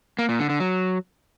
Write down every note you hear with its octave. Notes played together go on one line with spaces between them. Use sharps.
A#3
A#2
D3
D3
F#3